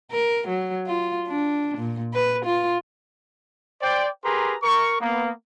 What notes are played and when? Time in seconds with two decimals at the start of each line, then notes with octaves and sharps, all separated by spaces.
0.11 A#4
0.48 F#3
0.86 F4
1.27 D4
1.77 A#2
2.13 B4
2.45 F4
3.82 C5 D5 G5
4.24 G4 G#4 A#4 B4 A#5 C6
4.63 A#4 C#6
5.01 A#3 B3